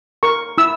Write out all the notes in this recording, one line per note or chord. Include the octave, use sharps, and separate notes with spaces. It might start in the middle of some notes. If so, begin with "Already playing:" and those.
A#4 C#6
E4 E6